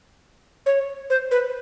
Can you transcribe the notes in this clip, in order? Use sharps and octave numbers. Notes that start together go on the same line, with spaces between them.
C#5
C5
B4